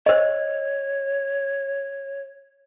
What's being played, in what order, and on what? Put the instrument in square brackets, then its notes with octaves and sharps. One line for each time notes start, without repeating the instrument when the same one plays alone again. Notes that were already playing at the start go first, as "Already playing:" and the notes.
[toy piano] C5 D#5 [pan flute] C#5